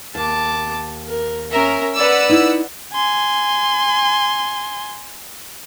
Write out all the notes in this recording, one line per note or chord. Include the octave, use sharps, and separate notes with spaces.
D#2 A5 D6
A#4
C#4 A#4 E5
B4 D5 F#5 E6
D#4 E4
G#5 C6